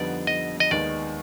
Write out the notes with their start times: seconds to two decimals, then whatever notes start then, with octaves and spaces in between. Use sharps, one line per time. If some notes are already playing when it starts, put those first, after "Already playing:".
Already playing: F2 D3 G3 B3 D#4 D5
0.27 D#5
0.60 D#5
0.71 D#2 D#3 G#3 B3 D#4 D5